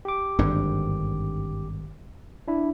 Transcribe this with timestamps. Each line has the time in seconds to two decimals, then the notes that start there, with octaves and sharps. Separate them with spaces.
0.05 G4 D6
0.39 G#1 G2 D3
2.48 D4 E4